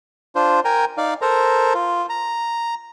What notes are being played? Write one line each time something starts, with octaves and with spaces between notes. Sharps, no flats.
D4 F4 C5
A#4 G5 G#5 A#5
D#4 D5 F5
A4 A#4 C5 A#5
F4
A#5